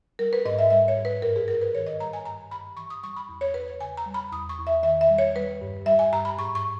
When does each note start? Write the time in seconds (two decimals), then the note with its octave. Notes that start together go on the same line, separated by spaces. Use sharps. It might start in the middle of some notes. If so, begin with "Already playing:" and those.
0.19 G3 A#4
0.33 B4
0.45 G#2 D#5
0.59 E5
0.70 G3 E5
0.88 C#5
0.97 G#2
1.05 B4
1.22 G2 A#4
1.36 G#4
1.48 G2 A#4
1.61 B4
1.74 D#3 C#5
1.87 D#5
2.00 G3 A#5
2.13 G#5
2.25 G2 A#5
2.51 G2 B5
2.77 E3 C#6
2.90 D#6
3.03 G3 C#6
3.16 B5
3.29 E2
3.41 C#5
3.54 E2 B4
3.68 C#5
3.80 C#3 G#5
3.97 A#5
4.06 G3
4.14 B5
4.31 E2 D#6
4.49 C#6
4.58 E2
4.67 E5
4.83 D#3 E5
5.01 E5
5.10 G3
5.18 C#5
5.35 G3 B4
5.61 G2
5.86 G3 E5
5.99 G#5
6.12 G2 A#5
6.25 B5
6.38 G#2 C#6
6.55 C#6